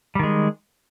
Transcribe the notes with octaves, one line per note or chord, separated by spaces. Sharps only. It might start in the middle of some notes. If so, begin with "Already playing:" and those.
D#3 G3 G#3